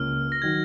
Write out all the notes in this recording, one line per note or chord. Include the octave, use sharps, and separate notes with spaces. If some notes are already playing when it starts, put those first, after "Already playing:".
Already playing: C#2 A#3 C#4 F6
A#6
D#3 F#3 G#6